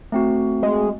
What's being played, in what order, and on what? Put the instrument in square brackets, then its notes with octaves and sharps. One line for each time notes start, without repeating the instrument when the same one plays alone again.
[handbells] A3 C4 F#4
[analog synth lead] G#3